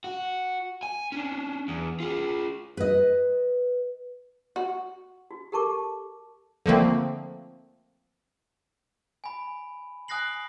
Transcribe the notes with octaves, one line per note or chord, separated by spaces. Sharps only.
F#4
G#5
C#4 D4
E2
F4 G#4
B4 D#5
F#4
F#4
G4 A4 A#4 A5 C#6 D6
D3 F3 A3 A#3 C4
G#5 B5
G#5 D#6 F#6 A#6 C7 F#7